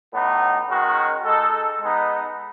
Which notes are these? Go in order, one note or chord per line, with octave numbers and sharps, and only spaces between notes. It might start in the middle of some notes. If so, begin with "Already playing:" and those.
A2 E3 B3 D#4
D#3 G#3 C#4 F#4
G#3 D#4 A4
G#3 B3 D#4